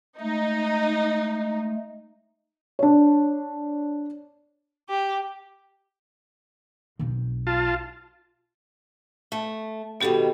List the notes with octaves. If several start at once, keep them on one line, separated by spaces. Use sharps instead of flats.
G#3 A3 D#4
D4 C#5
G4
B1 C4
F4 A5
A3
B2 D#3 G3 B3 G4 A4